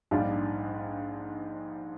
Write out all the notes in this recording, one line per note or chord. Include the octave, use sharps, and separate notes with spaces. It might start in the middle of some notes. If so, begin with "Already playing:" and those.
A#1 G#2 G3 D4 F4